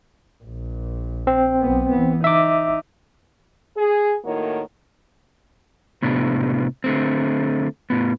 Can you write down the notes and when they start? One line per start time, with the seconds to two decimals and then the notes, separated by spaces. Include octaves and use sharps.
0.44 A#1
1.27 C4
1.61 B1 B3
1.90 E3 B3
2.24 D#4 E5 D6
3.77 G#4
4.25 A2 D#3 A#3 E4 F#4 C#5
6.02 A2 C3 B3 D4
6.84 D3 A3 C4
7.90 A2 B3